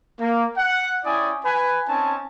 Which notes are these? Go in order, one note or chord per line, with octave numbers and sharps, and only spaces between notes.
A#3
F#5
C#4 E4 D5 G5 G#5 D#6
B4 G#5
C4 C#4 D#4 G#5 A5